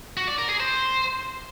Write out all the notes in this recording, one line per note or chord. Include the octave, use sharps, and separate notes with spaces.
F#4
D5
A#4
G#4
C5